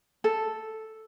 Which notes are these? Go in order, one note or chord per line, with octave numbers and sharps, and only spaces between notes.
A4